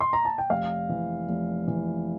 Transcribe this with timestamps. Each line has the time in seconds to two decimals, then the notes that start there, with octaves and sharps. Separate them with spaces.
0.00 C6
0.13 A#5
0.25 A5
0.38 G5
0.50 F1 F5
0.89 E3
1.28 F1
1.68 E3